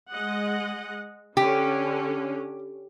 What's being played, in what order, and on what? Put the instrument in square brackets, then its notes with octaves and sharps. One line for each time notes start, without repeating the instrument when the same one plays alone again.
[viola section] G#3 D#5 F#5
[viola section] D3 C#4 [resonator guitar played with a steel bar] G4